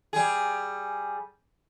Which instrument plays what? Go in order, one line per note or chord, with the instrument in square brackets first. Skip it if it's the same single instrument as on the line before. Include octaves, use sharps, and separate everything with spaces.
[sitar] G3 G#4